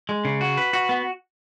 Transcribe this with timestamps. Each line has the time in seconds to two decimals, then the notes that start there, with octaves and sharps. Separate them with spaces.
0.09 G#3
0.25 C#3
0.41 F#4
0.58 B4
0.73 F#4
0.89 B3